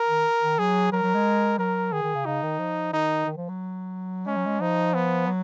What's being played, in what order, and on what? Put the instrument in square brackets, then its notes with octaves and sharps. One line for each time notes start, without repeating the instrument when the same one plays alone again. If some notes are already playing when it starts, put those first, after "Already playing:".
Already playing: [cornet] A#4
[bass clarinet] D#3
D#3
[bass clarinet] F#3 [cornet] G#4
[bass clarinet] F#3 [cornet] A#4
[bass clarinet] F#3
G#3
[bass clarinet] F#3 [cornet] A#4
[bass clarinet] D#3 [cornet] G#4
[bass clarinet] D#3
C#3
[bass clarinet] C#3 [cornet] D#4
[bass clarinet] D#3
F3
[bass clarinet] D#3 [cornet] D#4
[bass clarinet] D#3
F3
F#3
[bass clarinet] G#3 [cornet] C#4
[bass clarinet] F#3
G#3
[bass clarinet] F3 [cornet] D#4
[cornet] B3
[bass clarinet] F#3